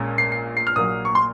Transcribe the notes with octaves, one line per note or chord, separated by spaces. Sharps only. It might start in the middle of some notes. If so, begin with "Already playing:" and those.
Already playing: A#1 A#2 G#3 C#4
C7
C7
C7
F6
A#1 A#2 F#3 A#3 D#6
C#6
C6